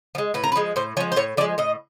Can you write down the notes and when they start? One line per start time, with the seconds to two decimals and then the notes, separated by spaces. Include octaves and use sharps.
0.15 F3
0.18 G#3
0.34 A2 B4
0.44 A#4
0.52 B4
0.56 F3 G#3
0.76 A2 C5
0.97 F3 C#5
1.00 G#3
1.12 C5
1.16 A2 C#5
1.37 F3 D5
1.41 G#3
1.58 A2 D#5